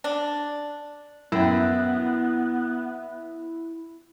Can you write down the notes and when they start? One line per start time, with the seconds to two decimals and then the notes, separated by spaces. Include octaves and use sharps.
0.04 D4
1.32 F#2 B3 E4 G5